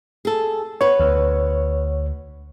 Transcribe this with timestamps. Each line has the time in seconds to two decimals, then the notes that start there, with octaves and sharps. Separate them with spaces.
0.25 G#4 A4
0.81 B3 B4 C#5
1.00 D2